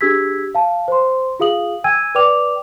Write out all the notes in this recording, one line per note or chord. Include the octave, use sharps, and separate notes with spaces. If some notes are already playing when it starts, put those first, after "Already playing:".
D4 G4 G#4 E6 G#6 B6
F5 A5
C5 C6
F4 G#4 F5 D#6 F#7
G5 G#5 E6 G#6 D#7
B4 D5 G5 D6 F7